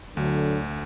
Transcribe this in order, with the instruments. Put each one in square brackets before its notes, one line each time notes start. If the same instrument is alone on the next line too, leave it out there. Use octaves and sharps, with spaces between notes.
[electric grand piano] D2 [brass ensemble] D3 F#3